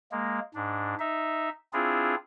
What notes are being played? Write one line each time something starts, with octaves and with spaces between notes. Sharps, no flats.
G#3 A#3
G#2 D4
D#4 E5
C4 D4 E4 F4 G#4